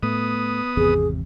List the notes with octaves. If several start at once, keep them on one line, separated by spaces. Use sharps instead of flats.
A2 A3 B3 D#6
G#1 E2 C3 G#4